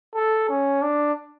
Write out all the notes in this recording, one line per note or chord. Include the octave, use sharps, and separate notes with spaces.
A4
C#4
D4